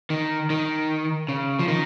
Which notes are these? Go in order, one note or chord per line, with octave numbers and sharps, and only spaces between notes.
D#3
D#3
C#3
F3
D#3